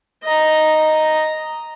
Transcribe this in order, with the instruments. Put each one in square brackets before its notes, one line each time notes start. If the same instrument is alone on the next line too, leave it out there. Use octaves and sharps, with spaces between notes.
[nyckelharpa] D#5 A#5